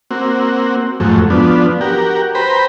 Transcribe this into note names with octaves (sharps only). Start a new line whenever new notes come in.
A#3 C4 F#4
F2 G#2 F#3 A3
F3 B3 D4
F#4 G4 A#4
B4 C5 G5 A#5 B5